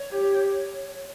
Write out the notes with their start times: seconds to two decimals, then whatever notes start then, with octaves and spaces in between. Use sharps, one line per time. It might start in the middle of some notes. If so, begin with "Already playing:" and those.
Already playing: C#5
0.11 G4